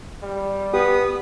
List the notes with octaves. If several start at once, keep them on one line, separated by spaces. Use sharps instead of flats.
G3
B3 G4 B4 D#6